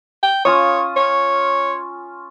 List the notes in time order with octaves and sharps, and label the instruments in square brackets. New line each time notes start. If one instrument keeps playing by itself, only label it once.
[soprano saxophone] G5
[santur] C#4 F4 D#6 [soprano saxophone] C#5
[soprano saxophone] C#5